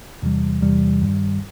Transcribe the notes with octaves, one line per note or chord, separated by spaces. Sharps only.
E2 C3 E3 G3
E2 C3 E3 G3
G2 D#3 G3